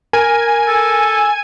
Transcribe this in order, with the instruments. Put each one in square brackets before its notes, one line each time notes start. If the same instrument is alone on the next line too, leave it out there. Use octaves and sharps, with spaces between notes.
[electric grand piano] A#4 [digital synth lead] G#5
[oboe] A4